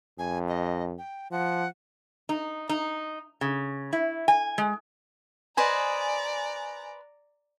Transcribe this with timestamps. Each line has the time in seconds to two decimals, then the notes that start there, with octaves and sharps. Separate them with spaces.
0.19 F2 G#5
0.49 D#5
0.98 G5
1.31 F3 F#5
2.29 D#4
2.69 D#4
3.41 C#3
3.93 E4
4.28 G#5
4.58 G#3
5.57 B4 C5 D5 D#5 G#5 A#5